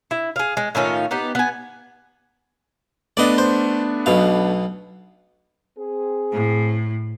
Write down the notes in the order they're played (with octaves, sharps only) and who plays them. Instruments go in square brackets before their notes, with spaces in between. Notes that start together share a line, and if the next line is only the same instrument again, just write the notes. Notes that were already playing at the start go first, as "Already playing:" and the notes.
[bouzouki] E4
G#4 F5
G#3
A2 D#3 C#4 F4
B3 D#4 G4
B3 G#5
[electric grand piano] A3 B3 D4 [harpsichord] D5 D#5
[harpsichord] C5
B1 B2 F5
[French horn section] C4 G#4
[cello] A2